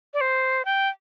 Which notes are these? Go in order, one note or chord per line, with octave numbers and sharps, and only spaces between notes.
D5
C5
G5